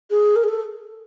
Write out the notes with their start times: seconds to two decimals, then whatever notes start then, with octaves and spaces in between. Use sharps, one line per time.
0.10 G#4
0.36 A#4
0.43 G#4
0.48 A4